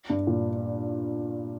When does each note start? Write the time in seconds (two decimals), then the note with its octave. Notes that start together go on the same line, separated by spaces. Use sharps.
0.10 G2
0.27 A#2